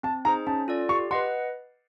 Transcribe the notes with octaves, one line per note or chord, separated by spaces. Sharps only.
C4 A5
D#4 G#4 C5 A#5
C#4 A5
F4 A4 D5
G4 C#6
B4 D#5 F#5 C6